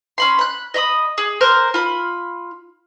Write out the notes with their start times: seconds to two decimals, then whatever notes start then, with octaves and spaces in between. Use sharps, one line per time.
0.18 C#4 B5 C6
0.39 B5 F#6
0.74 D#5 E5 B5 D#6
1.18 G#4
1.41 A#4 C5 F6 F#6
1.74 F4 B5